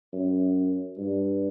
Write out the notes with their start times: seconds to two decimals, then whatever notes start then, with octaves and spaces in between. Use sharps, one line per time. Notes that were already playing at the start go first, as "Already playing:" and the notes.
0.13 F#2
0.98 G2